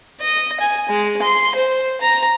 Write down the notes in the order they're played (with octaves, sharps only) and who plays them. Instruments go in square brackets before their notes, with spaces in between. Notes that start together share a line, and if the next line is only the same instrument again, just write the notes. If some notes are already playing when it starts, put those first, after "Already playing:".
[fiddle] D#5
G#5
G#3
C6
C5
A#5